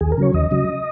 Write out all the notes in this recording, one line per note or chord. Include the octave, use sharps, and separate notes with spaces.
D#2 G#4
A#4
C#3 F#3 C#5
D#2 D#5
C#3 F#3